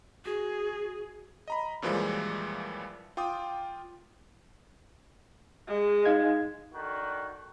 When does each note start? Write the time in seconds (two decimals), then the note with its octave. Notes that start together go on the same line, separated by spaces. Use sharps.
0.25 F#4 G#4
1.48 D#5 A#5 B5
1.82 F#2 A#2 E3 F3 G3 G#3
3.17 F4 G5 D6 D#6
5.68 G#3
6.05 D#4 F5 G#6
6.74 D3 D#3 F#4